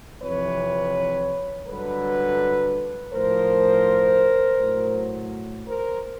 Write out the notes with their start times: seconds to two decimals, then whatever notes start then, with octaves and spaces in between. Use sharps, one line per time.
0.22 F2 C3 E3 B4 C#5
1.67 G2 D3 F#3 A4 B4
3.12 A2 F3 A#4 C5
4.58 A2 F#3
5.66 A#4 C5